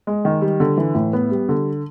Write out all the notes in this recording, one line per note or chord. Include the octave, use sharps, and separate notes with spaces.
G#3
D#3
G3
D3
E3
A2
B3
G3
D3